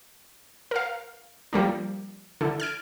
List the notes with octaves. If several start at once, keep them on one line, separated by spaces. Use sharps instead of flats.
A#4 F5
F3 G3 A#3 D4
D3 E4
F6 G#6 D7